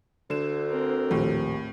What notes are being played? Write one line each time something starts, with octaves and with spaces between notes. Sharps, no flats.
D2 D3 E7
C4 A#4
A#1 D#2 A2